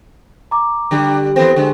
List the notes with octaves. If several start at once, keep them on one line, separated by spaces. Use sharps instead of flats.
A#5 D6
D3 G3
E3 B3 C4 A4 C5
D3 G#3